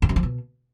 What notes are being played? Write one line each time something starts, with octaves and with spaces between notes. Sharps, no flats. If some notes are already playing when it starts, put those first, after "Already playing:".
F2
F#2
F3
B2